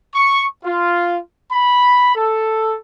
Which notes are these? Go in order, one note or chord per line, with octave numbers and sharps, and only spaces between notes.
C#6
F4
B5
A4